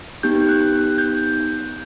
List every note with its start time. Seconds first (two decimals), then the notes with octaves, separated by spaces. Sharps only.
0.23 B3 D#4 G4 G6
0.49 F#6
0.73 F#6
0.98 G6